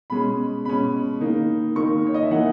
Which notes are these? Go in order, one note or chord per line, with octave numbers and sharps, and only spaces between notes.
B2 G#3 C#4 B5
B2 G#3 C#4 B5
D#3 A#3 D#4
D#3 A#3 D#4 C#6
C#5
D#5
E5
E3 A#3 D#4 F#5